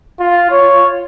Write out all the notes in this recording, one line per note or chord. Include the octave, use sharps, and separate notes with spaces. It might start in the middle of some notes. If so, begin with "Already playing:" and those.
F4
C#5